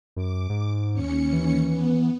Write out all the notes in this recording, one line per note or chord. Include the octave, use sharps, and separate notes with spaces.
F#2 D6
G#2
D#2 C#4 C#7
E3
B3